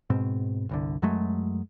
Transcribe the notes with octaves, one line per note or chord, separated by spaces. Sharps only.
G#2 B2 C4
G1 C2 D3
F#2 F#3 G#3 A3